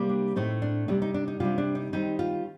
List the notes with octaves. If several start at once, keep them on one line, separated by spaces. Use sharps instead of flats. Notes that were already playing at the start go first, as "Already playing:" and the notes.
Already playing: C3 G3 A#3
D4
A2 A3 C4 D#4
D4
C3 G3 D4 D#4
D#4
D4
D#4
C3 G3 D4 F4
D4
D#4
D#3 G3 C4 D#4
F4